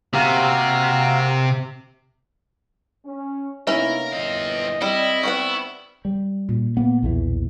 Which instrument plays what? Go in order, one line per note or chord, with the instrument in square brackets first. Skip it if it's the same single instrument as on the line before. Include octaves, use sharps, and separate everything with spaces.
[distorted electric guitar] C3 [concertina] A#3 F#4 F5
[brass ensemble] C#4
[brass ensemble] C3 B3 D#4 [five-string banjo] A#3 C#4 E5 [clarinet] E4 [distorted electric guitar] A#4
[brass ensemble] G1 A#2 E3 [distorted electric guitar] C4 F5 [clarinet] D#5
[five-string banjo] G3 [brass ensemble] C4 [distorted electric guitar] E4 [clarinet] D#5
[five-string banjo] G3 B3 F#5 [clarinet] C#6
[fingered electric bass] G3
[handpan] A#2
[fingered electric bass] A#3 B3
B1 E2 E3